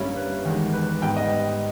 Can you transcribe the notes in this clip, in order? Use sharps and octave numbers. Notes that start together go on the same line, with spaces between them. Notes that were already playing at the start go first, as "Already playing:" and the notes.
Already playing: G2 G3 A#3 C#4 E4
B4
E2 D#3 G#3
B4
G#2 G3 B3 G5
D#5